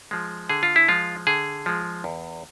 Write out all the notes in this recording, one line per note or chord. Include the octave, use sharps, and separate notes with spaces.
F3 G#3
D3 G#4
F4
E4
F3 G#3 F4
D3 G#4
F3 G#3
E2